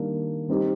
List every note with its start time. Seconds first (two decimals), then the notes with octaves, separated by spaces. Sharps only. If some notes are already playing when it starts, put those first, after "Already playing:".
Already playing: D#3 G3 A#3 D4
0.48 G3 C4 D#4 G4